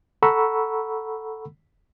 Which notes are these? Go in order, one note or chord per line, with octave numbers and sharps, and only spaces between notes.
A4 F#5 A#5 B5 C#6 E6